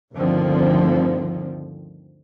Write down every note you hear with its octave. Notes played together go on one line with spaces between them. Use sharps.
G1 D2 D3 D#3 F3 C4